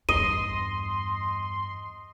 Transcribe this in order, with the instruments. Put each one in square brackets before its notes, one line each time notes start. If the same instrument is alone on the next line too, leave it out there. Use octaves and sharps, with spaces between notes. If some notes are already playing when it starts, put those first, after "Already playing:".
[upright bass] E2 G2 [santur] D#5 [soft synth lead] C6 [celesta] D#7